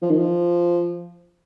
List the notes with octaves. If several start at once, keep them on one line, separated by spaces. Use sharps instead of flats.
F3
D#3
F3